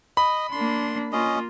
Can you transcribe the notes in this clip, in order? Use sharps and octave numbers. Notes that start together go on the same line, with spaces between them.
D#5 B5
A#3 D4 C6
A#3 C#4 F4 D#5